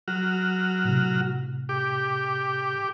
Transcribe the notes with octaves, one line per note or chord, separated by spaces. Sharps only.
F#3 F#4 F6
A2 C3
G4 D6